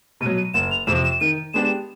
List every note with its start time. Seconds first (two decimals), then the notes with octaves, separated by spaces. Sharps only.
0.21 B2 D#7
0.26 F#3
0.37 D#7
0.54 F#1 E7
0.71 F7
0.87 F2 C3 E7
1.04 E7
1.20 D#3 D#7
1.54 G#3 B3 D4 G4 E7